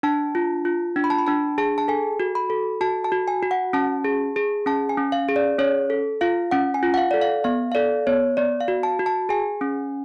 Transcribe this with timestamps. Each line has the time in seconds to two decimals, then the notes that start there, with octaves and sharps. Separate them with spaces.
0.03 D4 A5
0.35 F4
0.65 F4
0.96 D4
1.04 B5
1.10 A5
1.18 B5
1.27 D4 A5
1.58 G#4 A5
1.78 A5
1.88 A4 G#5
2.20 F#4
2.35 B5
2.50 A4
2.81 F#4 A5
3.04 A5
3.12 F#4
3.28 G#5
3.43 F#4
3.51 F#5
3.73 C#4 A5
4.04 G#4
4.36 G#4
4.66 C#4 A5
4.89 G#5
4.97 C#4
5.12 F5
5.29 G#4
5.36 D5
5.59 C#4 C#5
5.90 A4
6.21 F4 F5
6.51 C#4 F#5
6.74 G#5
6.83 F4
6.94 F#5
6.98 F5
7.11 A4 D5
7.21 F5
7.44 B3 F5
7.72 F5
7.75 A4 D5
8.07 B3 C#5
8.37 B3 D5
8.60 F5
8.68 F#4
8.83 A5
8.99 F#4
9.06 A5
9.29 G#4 G#5
9.61 C#4